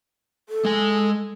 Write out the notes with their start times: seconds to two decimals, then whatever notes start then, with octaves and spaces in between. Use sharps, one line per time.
0.49 A4
0.65 G#3 G#5